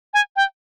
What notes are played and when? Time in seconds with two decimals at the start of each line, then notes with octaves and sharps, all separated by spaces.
0.14 G#5
0.36 G5